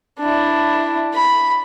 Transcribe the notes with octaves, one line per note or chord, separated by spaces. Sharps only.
D4 E4
B5